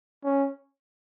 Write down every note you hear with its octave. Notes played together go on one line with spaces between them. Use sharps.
C#4